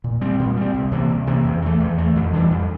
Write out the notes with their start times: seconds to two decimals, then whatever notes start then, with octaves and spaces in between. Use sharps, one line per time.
0.04 A#2
0.21 G3 C4
0.39 A#2
0.57 G3 C4
0.74 C2
0.92 C3 E3 A#3
1.09 C2
1.27 C3 E3 A#3
1.44 E2
1.62 E3 A3
1.80 E2
1.98 E3 A3
2.16 F2
2.33 E3 G3 D4
2.51 F2